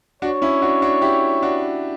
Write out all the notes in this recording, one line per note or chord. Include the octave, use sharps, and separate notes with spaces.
D4 F#4 C#5
C#4 E4
D4 F#4
D4 F#4
E4 G4
D4 F#4